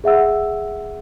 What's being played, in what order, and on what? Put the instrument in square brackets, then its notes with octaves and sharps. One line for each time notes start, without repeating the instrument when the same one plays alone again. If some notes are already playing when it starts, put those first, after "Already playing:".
[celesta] G#4 E5 F#5 E6